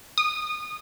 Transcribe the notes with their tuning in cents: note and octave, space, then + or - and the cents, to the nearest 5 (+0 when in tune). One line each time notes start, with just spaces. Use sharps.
D#6 -25